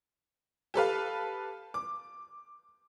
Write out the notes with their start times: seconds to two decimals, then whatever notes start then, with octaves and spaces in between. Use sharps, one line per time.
0.74 G4 A4 B4 F5
1.74 D6